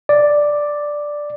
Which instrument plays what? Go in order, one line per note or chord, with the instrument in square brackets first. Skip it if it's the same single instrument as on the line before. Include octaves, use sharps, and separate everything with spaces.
[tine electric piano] D5